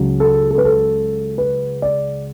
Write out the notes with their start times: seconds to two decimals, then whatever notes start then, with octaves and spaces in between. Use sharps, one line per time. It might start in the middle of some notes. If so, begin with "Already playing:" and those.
Already playing: C#2 C#3 F#3 C#4
0.20 A4
0.51 A4
0.58 B4
0.65 A4
1.38 B4
1.82 D5